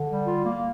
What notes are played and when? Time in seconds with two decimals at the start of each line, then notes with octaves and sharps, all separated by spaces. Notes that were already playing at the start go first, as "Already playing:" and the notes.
Already playing: D3
0.08 G3
0.26 F4
0.46 A#3